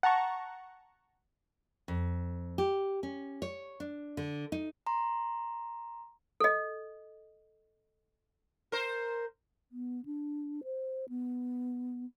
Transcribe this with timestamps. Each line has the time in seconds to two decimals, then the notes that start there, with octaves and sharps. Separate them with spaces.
0.03 F#5 A5 A#5 C#6
1.88 F2
2.58 G4
3.03 C#4
3.42 C#5
3.80 D4
4.17 D3
4.52 D#4
4.87 A#5 C6
6.40 A4 D#5
8.72 A#4 C5
9.72 B3
10.05 D4
10.64 C5
11.09 B3